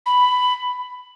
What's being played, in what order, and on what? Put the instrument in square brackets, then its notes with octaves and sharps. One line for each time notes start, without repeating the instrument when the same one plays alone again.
[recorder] B5